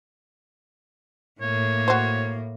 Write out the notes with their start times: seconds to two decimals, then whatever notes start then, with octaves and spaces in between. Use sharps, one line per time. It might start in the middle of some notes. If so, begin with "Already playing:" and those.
1.41 A2 A#3 C#5
1.88 F#4 C5